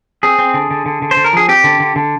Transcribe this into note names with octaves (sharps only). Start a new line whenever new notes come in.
C4 G#4
C4
D3
D3
D3
D3
C5
D3
A#4
F3 G#4
C4 G4
D3
D3
D3